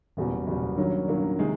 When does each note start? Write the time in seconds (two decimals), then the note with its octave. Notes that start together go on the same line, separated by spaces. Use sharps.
0.17 F#1 E2 B2 G3
0.47 F#1 E2 B2 G3
0.78 G2 D#3 F#3 A#3 C#4
1.08 G2 D#3 F#3 A#3 C#4
1.39 C3 D#3 G#3